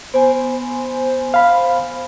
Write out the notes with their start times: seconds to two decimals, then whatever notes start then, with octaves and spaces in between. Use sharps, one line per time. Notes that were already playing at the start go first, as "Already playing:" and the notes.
0.14 B3 C5 G#5
1.34 F5 B5